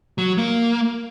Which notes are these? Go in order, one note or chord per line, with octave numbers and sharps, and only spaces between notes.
F#3
A#3